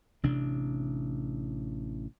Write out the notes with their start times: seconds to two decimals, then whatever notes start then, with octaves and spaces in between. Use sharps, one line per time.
0.23 A1 C3 D4